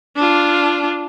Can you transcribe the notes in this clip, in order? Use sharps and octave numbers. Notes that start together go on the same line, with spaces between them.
D4 F4